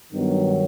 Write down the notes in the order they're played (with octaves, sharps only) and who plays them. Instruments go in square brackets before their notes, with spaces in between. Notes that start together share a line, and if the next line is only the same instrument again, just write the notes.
[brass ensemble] G2 D#3 F#3 B3